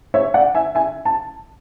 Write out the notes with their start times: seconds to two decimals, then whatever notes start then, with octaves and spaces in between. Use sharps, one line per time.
0.14 C#5 E5
0.34 D5 F#5
0.55 E5 G#5
0.75 E5 G#5
1.05 A5